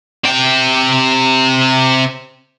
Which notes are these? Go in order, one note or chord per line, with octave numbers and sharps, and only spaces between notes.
C3 G5